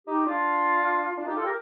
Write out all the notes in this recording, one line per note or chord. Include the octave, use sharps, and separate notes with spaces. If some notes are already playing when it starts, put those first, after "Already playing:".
D#4 G4
D4 F4
D4 F4
D#4 G4
F4 A4
G4 A#4